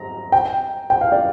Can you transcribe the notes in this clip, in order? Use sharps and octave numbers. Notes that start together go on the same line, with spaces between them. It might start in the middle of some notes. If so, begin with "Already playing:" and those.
Already playing: A#5
G5
G5
F5
D5